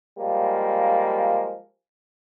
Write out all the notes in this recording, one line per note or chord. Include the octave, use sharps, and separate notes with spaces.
F3 G3 G#3 A#3